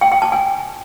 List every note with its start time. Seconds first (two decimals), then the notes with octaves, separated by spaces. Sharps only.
0.01 G5
0.12 G5
0.22 A5
0.32 G#5